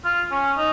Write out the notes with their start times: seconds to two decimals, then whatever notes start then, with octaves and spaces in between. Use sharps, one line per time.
0.04 F4
0.31 C#4
0.57 D#4